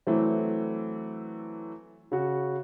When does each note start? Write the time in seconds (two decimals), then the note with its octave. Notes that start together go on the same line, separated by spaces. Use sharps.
0.07 E3 F#3 A3 C4
2.12 C#3 F#4